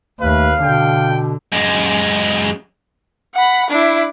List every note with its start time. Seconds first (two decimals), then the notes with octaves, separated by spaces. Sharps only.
0.21 D#2 A3 B4 F5
0.64 B2 D3 G5
1.52 F#2 G#3
3.35 F#5 B5
3.70 D4 E4